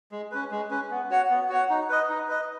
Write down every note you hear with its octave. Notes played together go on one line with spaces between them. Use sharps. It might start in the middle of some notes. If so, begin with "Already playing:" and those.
G#3
C#4 B4
G#3
C#4 B4
B3
F#4 C#5 F#5
B3
F#4 C#5 F#5
D#4
B4 D#5
D#4
B4 D#5